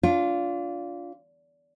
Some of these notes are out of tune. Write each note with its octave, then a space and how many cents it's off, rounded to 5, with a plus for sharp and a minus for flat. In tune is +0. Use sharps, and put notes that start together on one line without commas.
D4 -30 F4 +0